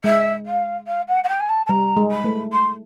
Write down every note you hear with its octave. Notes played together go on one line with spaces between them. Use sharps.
G#3 E5
F5
F5
F#5
F#5
G5
G#5
A5
A5
G3 A#5
G#3
B5
A3
C6